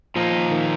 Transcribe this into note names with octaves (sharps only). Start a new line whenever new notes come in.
A#2 F3 A#3 D#4
D#3